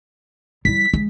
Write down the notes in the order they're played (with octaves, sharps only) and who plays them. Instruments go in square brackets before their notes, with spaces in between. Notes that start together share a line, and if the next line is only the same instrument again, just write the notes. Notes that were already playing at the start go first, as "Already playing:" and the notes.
[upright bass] G3 E4 [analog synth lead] B6
[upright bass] G#3